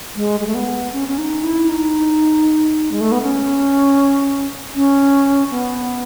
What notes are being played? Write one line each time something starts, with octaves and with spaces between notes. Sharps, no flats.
G#3
G#3
A3
B3
C#4
C#4
D#4
E4
D#4
G#3
A3
B3
C#4
C#4
B3